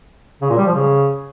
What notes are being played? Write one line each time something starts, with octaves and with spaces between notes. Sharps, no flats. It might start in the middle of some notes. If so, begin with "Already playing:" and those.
C#3
A#2
G3
F3
C#3